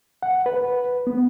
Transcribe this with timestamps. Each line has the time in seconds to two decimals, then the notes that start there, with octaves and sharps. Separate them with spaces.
0.23 F#5
0.46 B4
1.07 B3